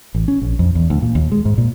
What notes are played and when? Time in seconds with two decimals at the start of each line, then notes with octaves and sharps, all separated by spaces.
0.15 A1
0.28 C#4
0.42 A#1
0.59 F2
0.75 E2
0.90 D2
1.02 A#2
1.15 D#2
1.32 G#3
1.45 G#2
1.58 A#2